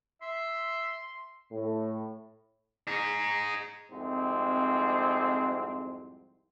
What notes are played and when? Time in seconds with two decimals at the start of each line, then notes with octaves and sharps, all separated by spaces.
0.22 E5 C6
1.51 A2
2.88 D#4 G#4
3.90 C2 F2 G#2 C4